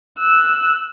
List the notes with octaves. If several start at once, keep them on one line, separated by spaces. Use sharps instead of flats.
E6 F#6